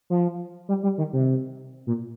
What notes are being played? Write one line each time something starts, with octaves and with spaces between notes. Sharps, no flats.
F3
G3
G3
D#3
C3
A#2